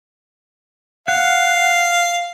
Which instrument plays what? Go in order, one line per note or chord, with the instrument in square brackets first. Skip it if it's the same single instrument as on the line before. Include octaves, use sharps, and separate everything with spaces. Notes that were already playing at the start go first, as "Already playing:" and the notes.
[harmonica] F5 [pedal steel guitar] F#5